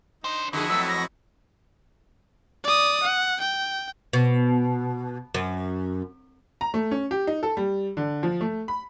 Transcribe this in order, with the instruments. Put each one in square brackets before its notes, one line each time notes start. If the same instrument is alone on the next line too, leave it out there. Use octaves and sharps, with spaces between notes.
[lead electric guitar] D4 C5 [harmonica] D#4
[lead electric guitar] F2 [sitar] D3 G#4 [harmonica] E4 F#4 D#5
[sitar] F#3 A3 B3 [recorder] E6
[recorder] A#6
[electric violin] D5 D#6
F#5
G5
[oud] B2
F#2
[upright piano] A#5
A3
C#4
G4
D#4
A4
G3
D3
F3
A3
B5